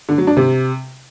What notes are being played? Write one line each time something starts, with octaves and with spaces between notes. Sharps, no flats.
D3
F#3
D4
C3